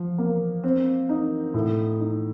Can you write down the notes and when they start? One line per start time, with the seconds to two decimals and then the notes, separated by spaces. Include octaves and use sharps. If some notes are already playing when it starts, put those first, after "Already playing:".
Already playing: F3
0.18 A#3
0.64 C4
1.09 D#4
1.54 A2
2.00 D#4